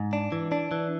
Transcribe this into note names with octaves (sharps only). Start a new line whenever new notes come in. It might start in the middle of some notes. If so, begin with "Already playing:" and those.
Already playing: G#2
D4
E3
D4
E3